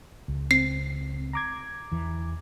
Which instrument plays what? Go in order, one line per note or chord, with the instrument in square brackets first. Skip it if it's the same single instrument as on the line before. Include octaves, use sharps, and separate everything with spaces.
[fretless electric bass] C#2
[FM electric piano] C4 [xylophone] C7
[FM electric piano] A#5 D6 G#6
[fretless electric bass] E2 E3